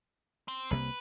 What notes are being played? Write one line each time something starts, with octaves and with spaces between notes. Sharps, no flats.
C4
C2 C3 A#3 B4